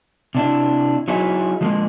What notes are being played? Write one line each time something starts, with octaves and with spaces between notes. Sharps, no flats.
C3 D4 E4
F#3 D#4 E4 G#4
F3 G#3 A#3